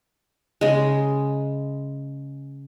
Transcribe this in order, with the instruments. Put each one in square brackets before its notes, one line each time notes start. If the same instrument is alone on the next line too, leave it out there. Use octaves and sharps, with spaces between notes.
[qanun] C#3 G#3